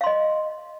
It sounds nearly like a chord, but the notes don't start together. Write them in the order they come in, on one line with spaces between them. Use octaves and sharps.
F5 C6 D#5